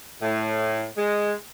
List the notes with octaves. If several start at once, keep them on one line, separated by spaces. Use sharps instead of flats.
A2
G#3